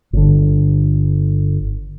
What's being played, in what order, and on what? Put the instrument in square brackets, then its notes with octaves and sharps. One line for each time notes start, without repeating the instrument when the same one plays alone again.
[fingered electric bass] G1 D3